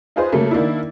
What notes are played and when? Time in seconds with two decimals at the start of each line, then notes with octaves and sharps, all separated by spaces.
0.16 D#4 F4 G#4 B4 C5
0.32 C#3 F#3 A3 A#3
0.51 D#3 A#3 D4 E4